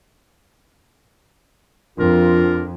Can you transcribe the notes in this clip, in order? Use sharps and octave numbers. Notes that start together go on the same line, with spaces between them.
F2 D4 F4 A#4